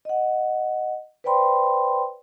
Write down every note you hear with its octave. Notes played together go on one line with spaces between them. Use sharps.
D#5 F#5
B4 C5 D5 G5 B5 C6